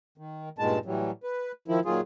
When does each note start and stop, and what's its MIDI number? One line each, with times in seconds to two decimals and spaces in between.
0.18 0.49 51
0.58 0.79 43
0.58 0.79 46
0.58 0.79 51
0.58 0.79 56
0.58 0.79 81
0.85 1.11 45
0.85 1.11 52
0.85 1.11 54
0.85 1.11 55
1.23 1.52 71
1.68 1.80 51
1.68 1.80 53
1.68 1.80 64
1.85 2.01 46
1.85 2.01 51
1.85 2.01 54
1.85 2.01 65
1.85 2.01 68